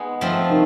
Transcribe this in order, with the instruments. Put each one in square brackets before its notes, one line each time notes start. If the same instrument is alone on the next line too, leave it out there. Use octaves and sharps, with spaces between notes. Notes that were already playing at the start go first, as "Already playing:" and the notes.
Already playing: [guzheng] G#3 B3 D#4 G#4
F3 A3 C4
[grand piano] D#3